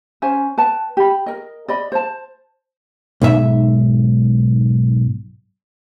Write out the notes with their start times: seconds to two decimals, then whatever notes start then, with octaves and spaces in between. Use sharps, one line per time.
0.22 C#4 C5 G#5
0.58 B4 G5 A5
0.97 G4 B5
1.26 A#4 D#5
1.68 D5 D#5 B5
1.92 C5 A5
3.22 B1 G#2 E5